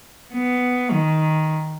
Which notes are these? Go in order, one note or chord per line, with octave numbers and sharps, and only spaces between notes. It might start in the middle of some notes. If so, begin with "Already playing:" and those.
B3
D#3